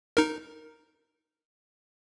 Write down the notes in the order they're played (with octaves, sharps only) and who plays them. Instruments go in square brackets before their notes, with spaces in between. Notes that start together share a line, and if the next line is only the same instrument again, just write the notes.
[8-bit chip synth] D#4 A#4